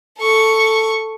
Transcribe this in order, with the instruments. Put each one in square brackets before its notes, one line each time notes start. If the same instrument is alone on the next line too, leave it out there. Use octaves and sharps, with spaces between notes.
[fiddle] A4 C#6